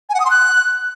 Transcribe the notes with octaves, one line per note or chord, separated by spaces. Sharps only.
G#5
F#5
D#6
C6
F#6